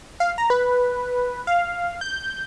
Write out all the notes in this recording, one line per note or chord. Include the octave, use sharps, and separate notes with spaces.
F5
A#5
B4
F5
G6